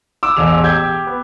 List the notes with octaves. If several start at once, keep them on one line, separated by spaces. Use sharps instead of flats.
D6 E6
E1 A1 G#4 F7
G4 G6 G#6
B3